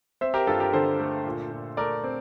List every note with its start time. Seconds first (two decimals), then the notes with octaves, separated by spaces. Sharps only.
0.21 C4 C5 E5
0.34 G4 A#4
0.47 G2 F4 A4
0.60 G4 A#4
0.73 D3 A4 C5
1.00 A3
1.26 A#2
1.51 A#2
1.77 A3 A#4 D5
2.04 C4